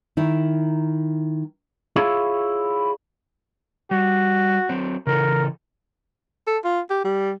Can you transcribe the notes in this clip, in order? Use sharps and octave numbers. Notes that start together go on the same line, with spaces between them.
D#3 E4 A#4
E4 F4 G#4 C#5 D5 F5
G3 F#4
F#3 C4
C#3 E3 A4 A#4
A4
F4
G4
G3